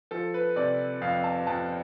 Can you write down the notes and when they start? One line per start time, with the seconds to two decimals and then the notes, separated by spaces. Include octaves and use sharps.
0.11 F3 A4
0.34 B4
0.56 C3 D5
1.01 F2 F5
1.24 A5
1.47 F2 A5